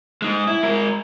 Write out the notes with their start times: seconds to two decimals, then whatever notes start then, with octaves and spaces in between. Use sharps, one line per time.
0.22 G#3 D#4
0.47 E4
0.63 G#3 A#4